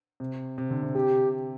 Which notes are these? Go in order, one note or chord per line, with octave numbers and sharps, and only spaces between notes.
C3
C3
D3
C3
C3 G4